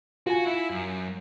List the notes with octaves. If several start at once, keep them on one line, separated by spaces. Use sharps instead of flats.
F4 F#4 G#5
E4
F#2